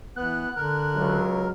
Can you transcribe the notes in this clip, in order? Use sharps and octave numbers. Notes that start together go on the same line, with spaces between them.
E3 B3 F#6
D3 A#4
C#2 F#3